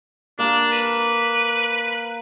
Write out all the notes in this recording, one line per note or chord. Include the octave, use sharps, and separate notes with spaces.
A#3 D4
B4